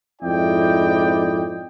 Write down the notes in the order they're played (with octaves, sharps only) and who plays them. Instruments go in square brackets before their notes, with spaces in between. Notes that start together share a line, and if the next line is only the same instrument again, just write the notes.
[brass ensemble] F2 G#2 E4 D5 D#5 G5